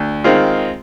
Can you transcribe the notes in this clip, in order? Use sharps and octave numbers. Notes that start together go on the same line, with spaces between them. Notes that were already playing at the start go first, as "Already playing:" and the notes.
Already playing: D2
D#3 G#3 C4 F4